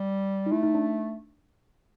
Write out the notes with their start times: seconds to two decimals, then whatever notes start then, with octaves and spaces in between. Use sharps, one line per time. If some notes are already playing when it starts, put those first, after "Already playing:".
Already playing: G3
0.46 D#4
0.52 A3 E4
0.63 D#4
0.75 D4